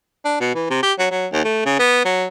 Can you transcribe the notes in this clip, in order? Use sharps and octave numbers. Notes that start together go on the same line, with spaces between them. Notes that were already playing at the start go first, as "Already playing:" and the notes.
D4
B2
E3
C3
G4
F#3
F#3
D#2
A3
C#3
B3
F#3